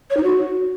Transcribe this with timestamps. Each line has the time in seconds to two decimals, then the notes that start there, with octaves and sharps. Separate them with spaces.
0.10 C#5
0.17 D#4
0.23 F#4